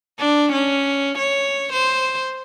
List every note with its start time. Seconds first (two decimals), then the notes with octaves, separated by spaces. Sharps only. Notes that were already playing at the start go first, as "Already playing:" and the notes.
0.18 D4
0.53 C#4
1.19 C#5
1.73 C5